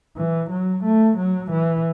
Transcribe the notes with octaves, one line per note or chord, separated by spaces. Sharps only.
E3
F#3
A3
F#3
E3